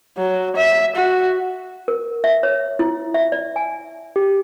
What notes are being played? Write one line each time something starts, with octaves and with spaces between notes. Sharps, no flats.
F#3
E5
F#4
A#4
E5
C#5
E4
E5
D5
G#5
G4